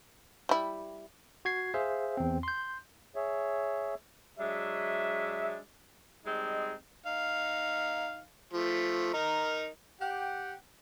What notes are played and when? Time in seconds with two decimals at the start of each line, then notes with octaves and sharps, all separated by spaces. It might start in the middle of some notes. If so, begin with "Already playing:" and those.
0.49 G3 E4
1.45 F#4 G#6 C7
1.74 G#4 C5 E5 F5
2.17 E2 C4
2.43 C6 G6
3.16 G#4 C#5 E5
4.38 F#3 G#3 D4 E5
6.26 G3 G#3 C4 D#4 D#5
7.06 D#4 F5
8.53 F3 A3
9.13 D#4 A#4
10.00 G4 F#5 G5